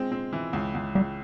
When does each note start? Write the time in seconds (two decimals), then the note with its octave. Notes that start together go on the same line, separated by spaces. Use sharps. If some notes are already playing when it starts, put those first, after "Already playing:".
Already playing: G#3 C4
0.11 C4
0.33 E3
0.53 C#2
0.75 C#2
0.95 C#2 G3